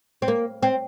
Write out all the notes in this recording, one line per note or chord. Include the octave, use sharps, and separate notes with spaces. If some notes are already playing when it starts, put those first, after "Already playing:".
C4
A#3
C4